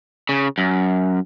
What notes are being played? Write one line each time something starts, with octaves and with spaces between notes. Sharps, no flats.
C#3
F#2